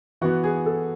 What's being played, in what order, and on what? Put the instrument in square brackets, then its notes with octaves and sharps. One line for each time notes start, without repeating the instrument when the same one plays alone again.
[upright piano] E3 B3 F#4
G#4
A4